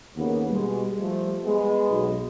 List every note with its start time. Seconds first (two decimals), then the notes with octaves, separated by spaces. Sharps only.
0.17 D#2 C#3 A#3 B3
0.51 B2 G3 G#3
0.97 F3 A3
1.44 G#3 B3
1.91 B1